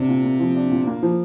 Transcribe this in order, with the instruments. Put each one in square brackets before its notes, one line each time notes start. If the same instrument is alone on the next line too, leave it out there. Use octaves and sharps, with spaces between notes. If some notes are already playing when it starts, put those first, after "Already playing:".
Already playing: [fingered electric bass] C3 C4 [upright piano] D4
[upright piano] A#2
A#3
F3
D4
A#2
A#3
F3